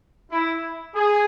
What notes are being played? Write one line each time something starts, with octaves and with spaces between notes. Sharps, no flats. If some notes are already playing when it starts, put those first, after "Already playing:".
E4
G#4